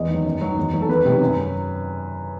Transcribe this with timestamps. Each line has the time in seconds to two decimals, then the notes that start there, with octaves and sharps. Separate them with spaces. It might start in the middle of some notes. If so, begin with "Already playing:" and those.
Already playing: E2 D#5
0.09 D#3 F#3
0.24 F#2
0.41 D#3 F#3
0.58 E2
0.74 D#3 F#3
0.82 A4
0.89 E2 B4
1.05 C3 D#3 F#3
1.21 F#2
1.36 F#3